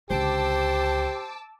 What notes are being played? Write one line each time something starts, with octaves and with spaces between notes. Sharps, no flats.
C#2 D3 G4 C5 A5 D6 E6